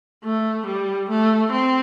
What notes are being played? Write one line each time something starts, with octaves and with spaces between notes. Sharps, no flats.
A3
G3
A3
C4